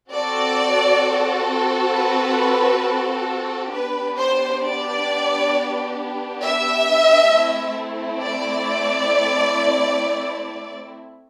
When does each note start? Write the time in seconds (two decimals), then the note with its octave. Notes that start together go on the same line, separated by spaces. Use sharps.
0.13 C4 F#4 A4 D5
1.93 B4
3.72 B3 D4 G4 B4
4.17 C5
4.62 D5
6.42 E5
7.32 A3 C4 E4
8.22 D5